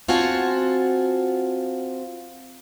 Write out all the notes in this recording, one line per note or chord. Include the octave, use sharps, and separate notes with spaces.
C4 F4 F#4 F#5 G#5 A5